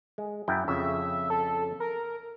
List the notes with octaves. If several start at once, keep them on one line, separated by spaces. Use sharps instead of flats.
G#3
F#2 E4 G5
F2 C#3 E5
A4
A#4